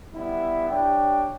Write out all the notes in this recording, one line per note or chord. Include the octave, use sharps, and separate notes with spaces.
G3 B3 E4
D4 G4 C#5 G5